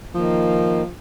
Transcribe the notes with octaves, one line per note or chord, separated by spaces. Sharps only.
D#3 F3 A#3